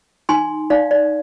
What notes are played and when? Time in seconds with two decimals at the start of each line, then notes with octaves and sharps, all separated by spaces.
0.29 D#4 G#5 C6
0.70 D#4 D5 F5
0.91 D5